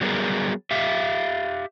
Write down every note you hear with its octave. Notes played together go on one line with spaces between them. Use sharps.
F#3 G3 B3 G#4 A#4
G4 E5 F5